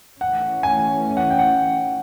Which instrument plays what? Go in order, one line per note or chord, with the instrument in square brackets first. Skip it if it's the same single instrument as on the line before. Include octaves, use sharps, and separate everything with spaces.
[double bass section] E3 A3 C#4 [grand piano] F#5
[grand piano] G#5
F#5
G5
F#5